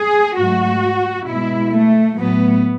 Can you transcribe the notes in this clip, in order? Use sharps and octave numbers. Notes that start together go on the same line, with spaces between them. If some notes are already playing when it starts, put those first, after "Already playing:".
Already playing: G#4
G#2 F#3 A3 F#4
B2 G#3 E4
A3
A2 F#3 A3 B3